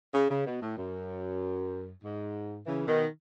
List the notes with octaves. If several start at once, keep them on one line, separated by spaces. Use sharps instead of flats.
C#3
C#3
B2
A2
F#2
G#2
C#3 E3
B2 D#3